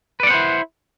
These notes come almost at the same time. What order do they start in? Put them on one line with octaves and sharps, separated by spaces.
B4 D5 F#5 C5 E4